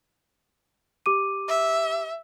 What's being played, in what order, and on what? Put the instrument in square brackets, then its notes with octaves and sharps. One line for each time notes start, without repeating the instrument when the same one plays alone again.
[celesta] G4 D6 D#7
[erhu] E5